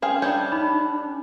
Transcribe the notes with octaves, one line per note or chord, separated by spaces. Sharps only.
C4 C#4 G#4 F5
G3 A3 D4 C#5 G6
D#4 B5
C#4